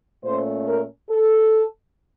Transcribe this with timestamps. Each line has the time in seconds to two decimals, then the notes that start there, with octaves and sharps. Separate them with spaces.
0.24 A#2 A3 C#4 C5
0.67 A#4
1.10 A4